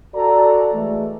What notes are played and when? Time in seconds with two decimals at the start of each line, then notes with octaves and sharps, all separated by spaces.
0.15 F#4 A4 D5 A#5
0.74 E3 G#3 A3